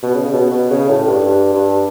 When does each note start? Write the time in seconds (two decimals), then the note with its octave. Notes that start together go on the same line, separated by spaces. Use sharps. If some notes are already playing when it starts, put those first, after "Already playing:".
0.03 B2
0.15 C#3
0.25 C#3
0.33 B2
0.51 B2
0.71 C#3
0.89 A2
1.07 G2
1.26 G2
1.54 G2